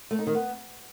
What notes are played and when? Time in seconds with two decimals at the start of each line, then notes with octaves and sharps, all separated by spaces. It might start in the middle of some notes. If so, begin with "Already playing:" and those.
0.11 A3
0.19 D#4
0.27 D#3
0.35 B3